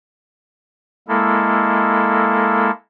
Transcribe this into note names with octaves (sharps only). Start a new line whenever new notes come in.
G#3 A#3 E4 A4